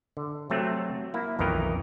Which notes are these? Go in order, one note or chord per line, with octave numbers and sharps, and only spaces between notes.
D3
C3 F#3 A3 C4
A#3 E4
B1 F2 D#3 E3 A#4 D#5